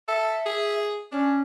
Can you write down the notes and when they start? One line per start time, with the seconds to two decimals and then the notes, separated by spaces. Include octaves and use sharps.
0.08 A4 E5
0.46 G#4
1.12 C#4 D4